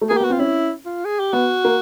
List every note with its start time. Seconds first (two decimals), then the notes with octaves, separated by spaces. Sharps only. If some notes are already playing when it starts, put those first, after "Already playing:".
0.01 A3
0.09 A#3 G#4
0.17 G4
0.20 B3 F#4
0.30 C4 F4
0.39 C#4 E4
0.86 F4
1.05 G#4
1.20 G4
1.33 B3 F#4
1.65 A#3